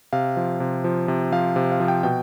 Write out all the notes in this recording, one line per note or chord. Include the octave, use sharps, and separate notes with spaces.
C3 F5
F3
C3
F3
C3
F3 F5
C3
F5
F3
G5
B2 G5